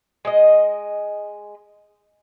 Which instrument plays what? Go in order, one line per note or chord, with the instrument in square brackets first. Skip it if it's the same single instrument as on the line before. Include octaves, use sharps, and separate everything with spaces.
[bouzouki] G#3 D#5